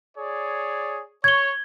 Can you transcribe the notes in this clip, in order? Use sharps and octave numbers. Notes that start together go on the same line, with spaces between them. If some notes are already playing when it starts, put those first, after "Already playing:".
G#4 C#5 D5
C#5 G#6 G7